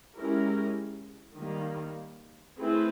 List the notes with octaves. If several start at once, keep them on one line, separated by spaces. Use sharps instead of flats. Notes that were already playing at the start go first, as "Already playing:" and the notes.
G#3 C#4 E4 G4 A#4
D#3 G3 A#3
A3 C4 E4 G#4 B4